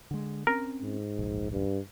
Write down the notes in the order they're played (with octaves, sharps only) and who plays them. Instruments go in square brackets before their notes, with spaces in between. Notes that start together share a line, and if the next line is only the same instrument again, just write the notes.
[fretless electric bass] D3 G#3
[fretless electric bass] C4 C#4 [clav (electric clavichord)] A#4
[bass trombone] G#2
[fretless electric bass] D1 A#1
[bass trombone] G2